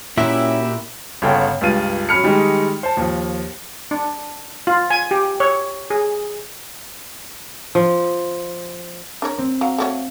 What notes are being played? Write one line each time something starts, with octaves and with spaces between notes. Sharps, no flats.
A#2 C#4 E4 F#4 G4 E5
G1 C#3 A4 C#5 F#5 G5
C#2 G2 F4 D#7
F#3 C#4 B5 F6 C#7
D#3 G3 G#3 D#4
C5 A5
D#2 F3
D4
F4
G#5
G4
C#5
G#4
F3
D4 A#4 C#5
C4
F#3 F5
A3 F#4 C#5